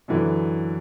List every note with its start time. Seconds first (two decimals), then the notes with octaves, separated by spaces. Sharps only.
0.08 F#2 D3 E3